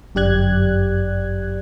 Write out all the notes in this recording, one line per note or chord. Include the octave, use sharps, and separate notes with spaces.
G1 F#2 G4 D5 F#6 G#6